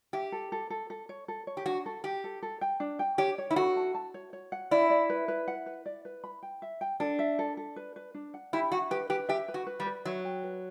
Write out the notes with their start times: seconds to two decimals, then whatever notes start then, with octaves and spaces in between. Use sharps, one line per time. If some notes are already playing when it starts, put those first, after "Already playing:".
0.13 G4 E5
0.32 A4
0.52 A4
0.70 A4
0.90 A4
1.09 C#5
1.28 A4
1.47 C#5
1.57 G4
1.66 D4 F#4
1.86 A4
2.04 G4 G5
2.24 A4
2.43 A4
2.61 G5
2.80 D4
2.99 G5
3.18 G4 C#5
3.38 C#5
3.51 E4
3.56 F#4 A4
3.76 A5
3.94 A5
4.14 C#5
4.33 C#5
4.52 F#5
4.71 E4 D5
4.90 D5
5.10 B4
5.28 B4
5.48 F#5
5.66 B4
5.86 D5
6.05 B4
6.24 B5
6.43 G5
6.62 E5
6.81 G5
7.00 D4 A4
7.19 E5
7.39 A4
7.57 A4
7.76 B4
7.96 B4
8.15 D4
8.34 F#5
8.53 E4 G4
8.72 F#4 F#5
8.91 G4 B4
9.10 G4 B4
9.29 G4 E5
9.48 B4
9.54 F#4
9.67 B4
9.80 G3
9.86 B4
10.05 F#3 E5
10.24 G5
10.43 B4